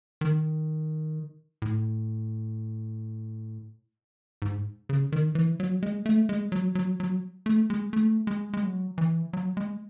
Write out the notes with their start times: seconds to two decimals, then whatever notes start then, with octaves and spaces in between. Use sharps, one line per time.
0.21 D#3
1.62 A2
4.42 G#2
4.89 C#3
5.12 D#3
5.35 E3
5.60 F#3
5.83 G#3
6.06 A3
6.29 G#3
6.52 F#3
6.75 F#3
7.00 F#3
7.46 A3
7.70 G#3
7.93 A3
8.27 G#3
8.53 G#3
8.63 F#3
8.98 E3
9.33 F#3
9.57 G#3